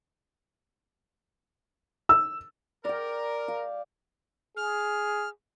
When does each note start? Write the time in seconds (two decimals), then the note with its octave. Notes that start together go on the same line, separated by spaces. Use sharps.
2.09 E6
2.85 A#4 D5 G5
3.48 F5
4.57 G#4 F6